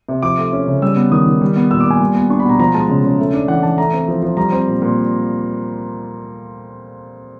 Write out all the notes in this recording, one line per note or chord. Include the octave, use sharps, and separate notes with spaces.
C3
F3 D6
A3
C#4
C#3
G3 E6
B3
D#3 D#6
D#3
G3
B3
A#2 E6
D6
A#2 G#5
G3
B3
D4 C#6
B5
B2 A#5
F3 A#5
G#3 A5
C#3
C#3
A3
D4
E3 F#5
E3 A5
A3 A#5
C4
F3
F3
G3 A#5
C4
A#2
A#2